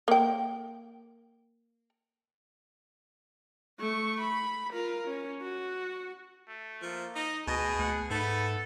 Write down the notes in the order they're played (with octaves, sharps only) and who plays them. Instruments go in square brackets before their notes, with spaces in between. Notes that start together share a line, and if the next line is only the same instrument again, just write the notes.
[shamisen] A#3 G5
[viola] A3 C#6
B5
F4 A#4
C#4
F#4
[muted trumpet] A3
[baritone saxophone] F3 [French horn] A#3
[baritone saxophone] D#4 [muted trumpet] D#5
[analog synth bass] D2 [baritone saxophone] B2 [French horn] G#4 [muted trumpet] D#5
[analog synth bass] D2 [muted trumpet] F#5
[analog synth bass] G#2 [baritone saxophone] A3 [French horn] B3 [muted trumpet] A4